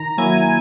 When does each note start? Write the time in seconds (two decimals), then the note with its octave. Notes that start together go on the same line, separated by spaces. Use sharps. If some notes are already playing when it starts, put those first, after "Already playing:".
Already playing: D#3 A#5
0.17 F#3 A#3 E4 G#5